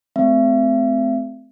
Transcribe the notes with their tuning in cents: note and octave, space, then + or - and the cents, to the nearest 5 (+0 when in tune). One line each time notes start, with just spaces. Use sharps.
A3 -45 C4 -30 E5 +40